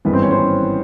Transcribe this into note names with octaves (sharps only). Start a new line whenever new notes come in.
G#1 G2 E3 B3 B4
C4 C5
C#4 C#5
C4 C5